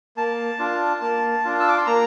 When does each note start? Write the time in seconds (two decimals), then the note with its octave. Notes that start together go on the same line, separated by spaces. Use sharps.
0.17 A#3 A5
0.59 D4 F4
1.02 A#3
1.45 D4 F4
1.60 E6
1.68 D6
1.77 C6
1.86 A#3 A#5